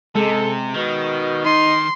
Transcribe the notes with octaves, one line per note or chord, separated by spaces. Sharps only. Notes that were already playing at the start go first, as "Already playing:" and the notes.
C3 G#3 A4
B2 D#3
D#4 C6